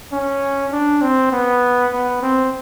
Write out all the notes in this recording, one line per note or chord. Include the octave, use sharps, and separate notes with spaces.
C#4
D4
C4
B3
B3
C4